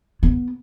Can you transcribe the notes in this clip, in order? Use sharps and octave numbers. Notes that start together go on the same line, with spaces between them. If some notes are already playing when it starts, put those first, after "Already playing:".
B3